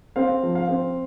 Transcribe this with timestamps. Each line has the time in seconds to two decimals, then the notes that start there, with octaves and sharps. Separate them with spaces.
0.16 C4 F5
0.43 F3
0.55 F5
0.69 C4